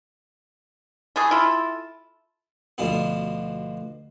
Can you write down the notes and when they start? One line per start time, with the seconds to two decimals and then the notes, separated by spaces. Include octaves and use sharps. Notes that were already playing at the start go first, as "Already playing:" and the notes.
1.16 E3 A3 G#4
1.31 E4 F4 A4
2.78 D2 B2 F3 B3